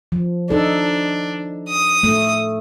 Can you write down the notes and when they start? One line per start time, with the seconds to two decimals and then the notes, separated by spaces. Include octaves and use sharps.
0.12 F3
0.50 D4 D#4 A4
1.69 D#6
2.03 A3